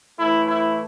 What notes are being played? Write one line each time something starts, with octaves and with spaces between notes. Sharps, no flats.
A2 E3 A3 E4
E4